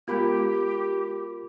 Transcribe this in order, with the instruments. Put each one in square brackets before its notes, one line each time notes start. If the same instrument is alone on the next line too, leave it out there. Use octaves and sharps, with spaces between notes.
[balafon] G#3 B3 [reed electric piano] F4 A#4 B5 [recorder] G4